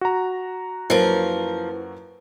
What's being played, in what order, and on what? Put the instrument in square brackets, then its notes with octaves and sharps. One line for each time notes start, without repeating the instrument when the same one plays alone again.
[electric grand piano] F#4 A#5
[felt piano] F#2 A#3 D7 [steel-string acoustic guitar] F3 A#4 [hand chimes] E4 B4